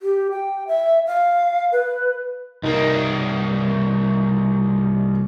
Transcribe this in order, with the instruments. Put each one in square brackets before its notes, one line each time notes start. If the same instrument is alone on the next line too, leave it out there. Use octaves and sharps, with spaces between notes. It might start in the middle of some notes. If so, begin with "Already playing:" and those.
[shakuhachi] G4
G5
E5
F5
B4
[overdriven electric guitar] C2 A#3 [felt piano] D#4